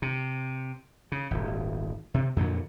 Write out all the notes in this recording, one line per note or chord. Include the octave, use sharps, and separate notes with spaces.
C3
C#3
D#1 G#1
C3
F2 A#2 D3 F#3